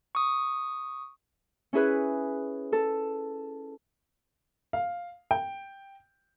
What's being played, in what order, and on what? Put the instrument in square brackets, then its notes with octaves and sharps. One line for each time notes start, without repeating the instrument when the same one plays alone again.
[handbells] C#6 D#6
[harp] C#4 E4 G#4 B4
A4
[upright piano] F5
G5